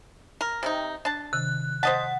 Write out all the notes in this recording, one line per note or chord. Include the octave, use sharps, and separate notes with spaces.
A#4
C3 C4 D#4
D4 A5
C3 D#3 F#6
C5 D#5 F#5 A5